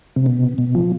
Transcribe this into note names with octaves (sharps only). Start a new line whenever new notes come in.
C3
B2
B2
F3